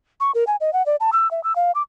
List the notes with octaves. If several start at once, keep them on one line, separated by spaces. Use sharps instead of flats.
C#6
A#4
G#5
D#5
F#5
D5
A5
E6
E5
E6
F5
D6